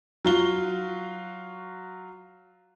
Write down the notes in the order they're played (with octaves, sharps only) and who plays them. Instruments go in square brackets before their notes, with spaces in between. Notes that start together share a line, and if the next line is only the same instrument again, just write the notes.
[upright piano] F#3 F4 G7